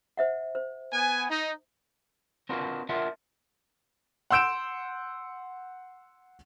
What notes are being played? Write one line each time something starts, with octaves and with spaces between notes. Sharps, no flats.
C5 E5 F#5
C5
B3 G#5
D#4
C4 D4 F4 F#4 A#4 B4
D4 F4 A#4 E5 F#5
F#5 C6 E6 G6 D7 E7